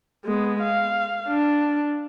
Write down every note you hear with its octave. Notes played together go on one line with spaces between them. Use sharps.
G#3 B3
F5
D4